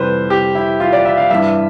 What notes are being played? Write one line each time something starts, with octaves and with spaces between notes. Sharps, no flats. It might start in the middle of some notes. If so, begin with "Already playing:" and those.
Already playing: F2 C3 E3 G3 B4 C5
G4
E4
F4
D5
E5
F5
G2 E3 G3 E5